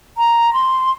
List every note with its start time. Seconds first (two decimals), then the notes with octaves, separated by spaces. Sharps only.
0.18 A#5
0.53 C6